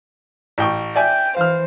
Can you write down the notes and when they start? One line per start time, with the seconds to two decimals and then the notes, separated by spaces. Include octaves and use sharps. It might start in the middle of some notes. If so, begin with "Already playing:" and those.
0.58 A1 G5 C#6
0.96 D5 E5 G5 G#5
1.37 E3 C5 F5 F6